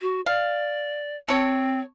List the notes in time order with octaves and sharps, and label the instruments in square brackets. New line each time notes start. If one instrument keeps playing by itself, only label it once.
[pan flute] F#4
[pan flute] D5 [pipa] F5
[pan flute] C4 [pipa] A4 C#5